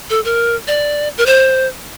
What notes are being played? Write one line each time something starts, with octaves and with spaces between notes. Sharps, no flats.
A4
A#4
D5
A#4
C5